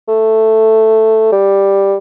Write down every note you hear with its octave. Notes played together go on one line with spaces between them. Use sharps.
A3
G3